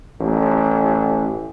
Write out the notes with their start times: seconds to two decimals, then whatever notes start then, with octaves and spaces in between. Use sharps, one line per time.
0.20 A1